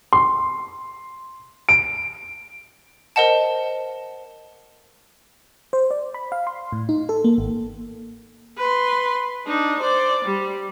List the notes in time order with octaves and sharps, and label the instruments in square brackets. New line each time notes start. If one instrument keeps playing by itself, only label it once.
[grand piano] C6
D7
[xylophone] A#4 C5 D#5 F#5 A5
[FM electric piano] C5
D5
B5
F5
C6
A2
D#4
A4
A#3
G#1
[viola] B4 C6
D4 D#4
C5 D5
G3